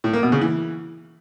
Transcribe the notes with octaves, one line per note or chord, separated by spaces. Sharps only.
A2
A#3
B2
C#3
E3